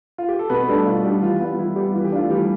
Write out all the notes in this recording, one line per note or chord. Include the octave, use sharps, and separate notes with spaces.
F4
G4
A4
B2 B3 B4
B4
G3 A3 D4 A4
B2 F4
G3 D4 G4
E3 F4
G3 B3 F4
E3 E4
G3 B3 G4
E3 F4
G4
A3 D4 F4
E3 G3 G4